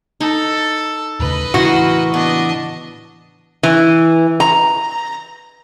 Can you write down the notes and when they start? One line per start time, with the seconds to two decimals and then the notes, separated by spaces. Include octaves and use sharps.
0.20 D#4 A4
1.20 D#2 A2 C#3 B4 D#5
1.54 A2 C#3 E3 E4 F#4 A#4 C6
2.14 B3 D4 D#5
3.63 E3
4.40 A#5